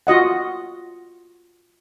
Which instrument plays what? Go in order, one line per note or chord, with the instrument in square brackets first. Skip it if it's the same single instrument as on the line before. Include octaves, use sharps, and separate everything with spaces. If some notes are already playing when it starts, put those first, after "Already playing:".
[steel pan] F4 F#4 D#5 F#5